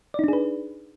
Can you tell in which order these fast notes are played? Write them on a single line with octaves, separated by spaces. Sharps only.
D5 D#4 D4 G#4 B4